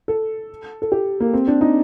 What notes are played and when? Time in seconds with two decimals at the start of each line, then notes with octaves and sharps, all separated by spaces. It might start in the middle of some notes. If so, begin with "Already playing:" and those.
0.08 A4
0.82 A4
0.92 G4
1.20 A#3
1.34 C4
1.48 D4
1.61 D#4